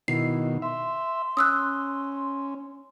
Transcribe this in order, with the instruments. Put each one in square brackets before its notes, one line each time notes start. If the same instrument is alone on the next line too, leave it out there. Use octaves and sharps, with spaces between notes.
[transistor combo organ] B2 D#3 [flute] E4 [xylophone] C7
[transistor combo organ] E5 [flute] C6
[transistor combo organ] C#4 [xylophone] D#6 E6 F#6